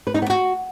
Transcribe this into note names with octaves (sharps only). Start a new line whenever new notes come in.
B4
D#4
B3
F#4